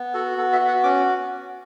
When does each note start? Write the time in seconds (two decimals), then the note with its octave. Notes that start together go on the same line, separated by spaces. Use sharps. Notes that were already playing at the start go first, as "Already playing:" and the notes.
Already playing: B3
0.14 F#4 A4
0.38 B3 A4
0.53 E5
0.60 F#4
0.68 F#5
0.83 C#4 D6